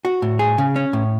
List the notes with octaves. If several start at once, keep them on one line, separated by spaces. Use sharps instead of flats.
F#4
A2
G#4
C#3
C#4
A2